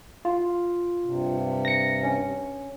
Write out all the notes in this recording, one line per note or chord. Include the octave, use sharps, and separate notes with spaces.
F4
G2 C3
A#6 C#7
C#4